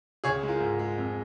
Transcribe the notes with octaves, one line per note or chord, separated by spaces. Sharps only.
C#2 G#4 C#5
G#3
F4 A#4
G#2
G#3
F2